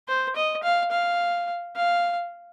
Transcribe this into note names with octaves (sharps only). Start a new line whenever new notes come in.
C5
D#5
F5
F5
F5